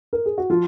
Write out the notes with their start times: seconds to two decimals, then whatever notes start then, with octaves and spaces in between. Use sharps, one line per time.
0.13 A#4
0.26 G#4
0.38 F#4
0.50 F3 F4